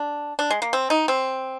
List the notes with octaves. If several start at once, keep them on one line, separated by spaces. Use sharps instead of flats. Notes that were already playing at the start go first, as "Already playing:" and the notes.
Already playing: D4
D4
G#3
A#3
C4
D#4
C4